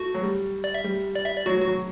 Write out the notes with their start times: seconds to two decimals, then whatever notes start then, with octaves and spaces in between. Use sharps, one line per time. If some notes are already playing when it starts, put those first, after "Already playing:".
Already playing: A3 F#4
0.14 F#3
0.23 G3
0.64 D5
0.75 E5
0.84 G3
1.15 D5
1.26 E5
1.36 D5
1.46 F#3 F#4
1.57 F#3
1.61 F#4
1.68 F#3